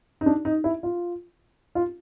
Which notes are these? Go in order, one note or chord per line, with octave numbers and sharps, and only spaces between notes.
D#4
D4
D#4
E4
F4
F4